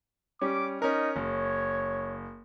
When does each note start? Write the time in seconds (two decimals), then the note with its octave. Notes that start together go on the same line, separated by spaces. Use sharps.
0.41 G3 C#4 D6
0.82 C#4 D#4 A#4
1.16 F#1 C#5